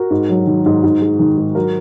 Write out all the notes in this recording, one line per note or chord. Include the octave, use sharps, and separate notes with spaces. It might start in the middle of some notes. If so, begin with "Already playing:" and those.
Already playing: F#4 A#4
G#2
F#3
D#3
G#2
G#2
G#3
D#3
G#2
F#3 F#4 A#4